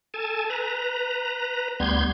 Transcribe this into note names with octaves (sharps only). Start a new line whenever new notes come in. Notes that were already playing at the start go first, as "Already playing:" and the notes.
A4 G#5 A5
B4 A#5
D2 G3 B3 C6 G6 G#6